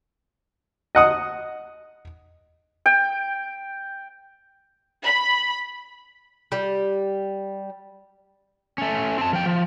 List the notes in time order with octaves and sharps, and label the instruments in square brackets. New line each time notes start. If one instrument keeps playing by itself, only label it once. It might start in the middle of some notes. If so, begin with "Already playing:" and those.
[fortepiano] D#5 F#5 D#6
[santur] G5
[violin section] B5
[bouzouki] G3
[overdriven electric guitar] A3 C#4
C4 A5
F3 G5
F3